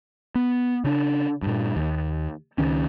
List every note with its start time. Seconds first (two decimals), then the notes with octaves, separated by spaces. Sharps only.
0.35 B3
0.84 C#3 D4
1.42 G2 A#2
1.76 D#2
2.58 C#2 D#3 C#4